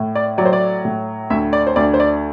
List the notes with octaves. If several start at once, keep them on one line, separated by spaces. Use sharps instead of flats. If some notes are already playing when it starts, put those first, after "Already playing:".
Already playing: A2
D5
F#3 D5
C5
D5
A2
D2 E5
D5
C5
D2 D5
C5
D5